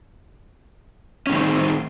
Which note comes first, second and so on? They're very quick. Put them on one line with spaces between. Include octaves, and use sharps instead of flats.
C#4 A2 D#3 C4